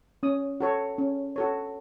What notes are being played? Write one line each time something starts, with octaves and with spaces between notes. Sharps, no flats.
C#4 D#6
F#4 A4 C#5
C#4
F#4 A4 C#5